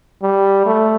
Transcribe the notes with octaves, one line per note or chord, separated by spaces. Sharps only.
G3
A3